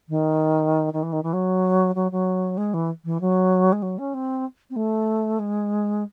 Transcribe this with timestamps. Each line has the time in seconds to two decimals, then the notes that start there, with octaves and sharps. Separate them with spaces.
0.09 D#3
0.93 D#3
1.02 E3
1.12 D#3
1.23 E3
1.33 F#3
1.95 F#3
2.11 F#3
2.57 G#3
2.73 E3
3.04 E3
3.20 F#3
3.72 G#3
3.82 F#3
3.98 C#4
4.14 C4
4.70 C4
4.76 A3
5.39 G#3